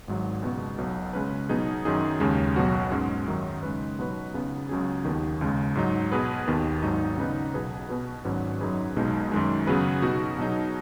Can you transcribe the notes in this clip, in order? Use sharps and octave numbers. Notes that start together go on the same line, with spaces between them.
G#1 G#2 F#3
C#2 B2 B3 F#4
B1 B2 F#3 B3
C#3 G#3 C#4 B4
B2 F#3 B3 D#4 G#4
F#2 D#3 F#3 D#4 G#4
D#2 C#3 G#3 C#4
B1 B2 F#3 B3 F#4
G#2 G#3 C#4
F#2 D#3 F#3 D#4
C#3 G#3 D#4 B4
B2 F#3 D#4 F#4 B4
C#2 C#3 B3 D#4
C#2 C#3 F#3 C#4 G#4
D#2 D#3 B3
C#2 C#3 G#3
G#2 F#3 D#4
B2 B3 G#4 B4
D#2 D#3 B3
G#1 G#2 F#3 D#4
C#3 B3 D#4 B4
B1 B2 B3 G#4 B4
B2 B3 F#4 B4
G#1 G#2 F#3 C#4 B4
F#2 F#3 D#4 G#4 B4
B1 B2 G#3 D#4
F#2 D#3 G#3
C#3 F#3 B3 G#4 B4
B2 B3 D#4 F#4
B2 F#3 D#4 G#4